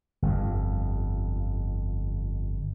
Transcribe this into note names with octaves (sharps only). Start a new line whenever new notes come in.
G1 F2